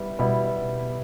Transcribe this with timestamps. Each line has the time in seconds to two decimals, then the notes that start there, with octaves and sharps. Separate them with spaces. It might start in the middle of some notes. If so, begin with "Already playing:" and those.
Already playing: G3 B3 E4
0.19 B2 G3 B3 E4